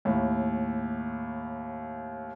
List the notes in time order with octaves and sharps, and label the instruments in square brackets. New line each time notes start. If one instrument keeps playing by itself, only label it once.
[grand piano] D#2 A2